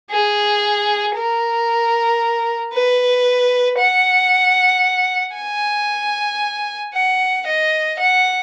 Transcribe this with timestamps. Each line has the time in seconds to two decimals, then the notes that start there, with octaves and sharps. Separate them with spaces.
0.11 G#4
1.16 A#4
2.73 B4
3.79 F#5
5.36 G#5
6.94 F#5
7.46 D#5
7.99 F#5